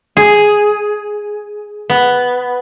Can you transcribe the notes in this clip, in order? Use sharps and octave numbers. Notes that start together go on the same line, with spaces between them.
G#4
B3